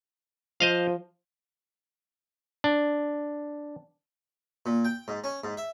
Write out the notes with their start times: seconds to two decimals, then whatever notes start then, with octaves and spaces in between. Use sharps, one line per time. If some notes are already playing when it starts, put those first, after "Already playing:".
0.60 F3 C5 D#5 F5
2.64 D4
4.66 A#2
4.85 G5
5.08 G#2
5.24 C#4
5.44 G#2
5.57 E5